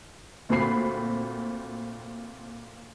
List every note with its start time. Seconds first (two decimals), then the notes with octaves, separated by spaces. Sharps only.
0.49 D2 A#2 C4 F#4 B5 C7